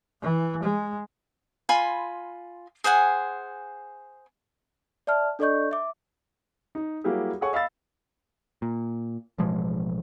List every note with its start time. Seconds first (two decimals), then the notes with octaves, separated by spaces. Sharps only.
0.22 E3
0.63 G#3
1.69 F4 G#5 B5 C6
2.84 G#4 C5 F#5 G#5
5.07 D5 E5 A5 F6
5.39 D4 A4 D5 D#5 C#6 G6
5.71 E5 D6
6.75 D#4
7.04 F#3 G3 A#3 E4 G4 G#4
7.41 G#4 A4 C#5 F#5 G#5 C#6
7.53 D#5 F5 B5 E6 A6
8.62 A#2
9.38 A1 B2 F3 G#3